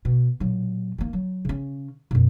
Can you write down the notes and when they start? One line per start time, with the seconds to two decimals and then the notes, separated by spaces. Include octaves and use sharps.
0.05 B2
0.40 A#2 F#3
0.98 D#3 A#3
1.13 F#3
1.45 C#3 C#4
2.11 F#2 B2